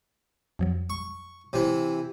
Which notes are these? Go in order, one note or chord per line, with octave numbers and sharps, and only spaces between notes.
F2 F3 F#3
C#6
C3 E3